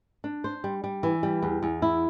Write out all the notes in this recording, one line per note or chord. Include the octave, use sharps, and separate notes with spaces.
D4
C5
G3
G3
E3
G3
E2
E2
E4